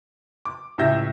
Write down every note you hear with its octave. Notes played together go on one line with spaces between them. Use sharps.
D6
C#2 A2 G4 E5 G6 A#6